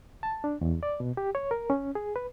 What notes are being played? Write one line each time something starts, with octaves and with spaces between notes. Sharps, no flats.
A5
D4
E2
D5
B2
G4
C#5
A#4
C#4
G#4
B4